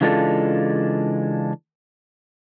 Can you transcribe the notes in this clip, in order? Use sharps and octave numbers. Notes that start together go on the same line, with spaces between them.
C#3 E3 G#3 D4 F4 A4